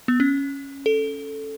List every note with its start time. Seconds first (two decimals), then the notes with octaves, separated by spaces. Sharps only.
0.08 B3
0.20 C#4
0.86 A4